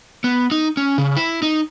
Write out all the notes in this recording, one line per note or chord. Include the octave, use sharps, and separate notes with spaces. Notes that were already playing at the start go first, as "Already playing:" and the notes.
B3
D#4
C#4
C#3
E4
D#4